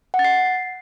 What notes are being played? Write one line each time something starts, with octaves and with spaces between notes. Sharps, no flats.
F#5
A6
C7